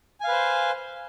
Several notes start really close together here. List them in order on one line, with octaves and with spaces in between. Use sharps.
G#5 F5 B4 C5